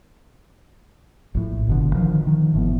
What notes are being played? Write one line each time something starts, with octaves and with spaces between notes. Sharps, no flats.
A#1 A2
G1 B2 D3
D3 D#3 F3
D#3 F3
G1 A2 F3 B3